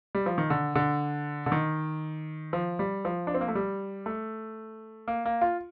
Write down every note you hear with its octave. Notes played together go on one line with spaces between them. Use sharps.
G3
F3
D#3
D3
D3
D3
D#3
F3
G3
F3
D4
C4
A#3
A3
G3
A3
A#3
A#3
F4